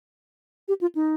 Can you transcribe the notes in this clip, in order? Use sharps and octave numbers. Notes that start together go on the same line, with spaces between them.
G4
F4
D#4